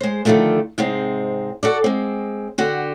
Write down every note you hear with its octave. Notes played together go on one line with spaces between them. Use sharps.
G#3 C5
D3 D#3 F3 F#3 A3 A#3
G#2 C3 G#3 C4
F#4 A4 D5
G#3 C4
D3 F#4 G4